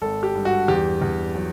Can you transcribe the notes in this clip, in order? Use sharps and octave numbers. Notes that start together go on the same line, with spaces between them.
G#1 A4
G4
G2
F#4
E2 G4
E2
F#3